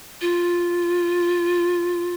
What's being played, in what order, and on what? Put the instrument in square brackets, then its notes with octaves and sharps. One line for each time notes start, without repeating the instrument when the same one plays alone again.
[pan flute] F4